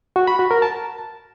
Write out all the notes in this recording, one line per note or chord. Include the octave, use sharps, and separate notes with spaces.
F#4
B5
F#4
A#4
A5